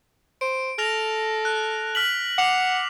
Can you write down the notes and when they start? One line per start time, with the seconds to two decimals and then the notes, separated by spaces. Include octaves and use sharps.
0.41 C5 D7
0.78 A4 F6 A#6 F7
1.45 F#6
1.95 F6 B6 F#7
2.38 F#5 D6 C7 F7